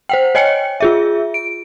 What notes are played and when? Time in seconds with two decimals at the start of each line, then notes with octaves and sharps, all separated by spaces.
0.09 C5 F#5 G5
0.35 C#5 D#5 G5 G#5 C#7
0.80 F4 G#4 E5
1.34 D7